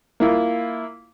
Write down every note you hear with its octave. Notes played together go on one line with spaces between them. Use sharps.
A#3 E4 F4